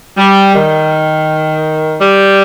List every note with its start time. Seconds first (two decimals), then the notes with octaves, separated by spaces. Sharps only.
0.17 G3
0.54 D#3
2.01 G3